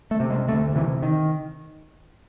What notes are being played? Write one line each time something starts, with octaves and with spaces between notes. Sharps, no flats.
A3
C3
G#3
D2 A3
C3 E3
D#3